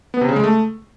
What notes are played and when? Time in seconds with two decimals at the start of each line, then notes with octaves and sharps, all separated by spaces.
0.14 B3
0.21 C3
0.29 C#3
0.36 G#3
0.44 A3